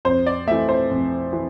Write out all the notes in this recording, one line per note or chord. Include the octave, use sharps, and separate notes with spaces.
F2 C5
D5
E3 A3 E5
C5
F2
E3